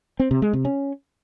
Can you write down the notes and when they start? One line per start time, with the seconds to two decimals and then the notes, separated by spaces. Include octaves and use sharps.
0.20 C4
0.31 C3
0.42 G#3
0.53 C3
0.65 C#4